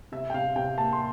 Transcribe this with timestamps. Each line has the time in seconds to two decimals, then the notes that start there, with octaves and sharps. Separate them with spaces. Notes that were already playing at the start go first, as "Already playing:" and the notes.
0.12 C3 E5
0.30 G5
0.34 C3 F5
0.56 C3 G5
0.78 A#3 A5
0.93 C6